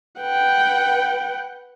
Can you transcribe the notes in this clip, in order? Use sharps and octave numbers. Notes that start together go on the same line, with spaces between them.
B4 F#5 G5